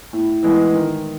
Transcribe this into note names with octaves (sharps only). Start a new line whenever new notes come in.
A2
E3 G#3 B3
D#3